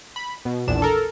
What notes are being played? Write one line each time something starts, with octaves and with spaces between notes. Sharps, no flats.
B5
B2
A#1 E2 D4 E7
A4 A#4